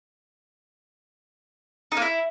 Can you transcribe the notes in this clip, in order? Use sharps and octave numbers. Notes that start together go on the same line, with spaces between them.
D#4
A#3
E4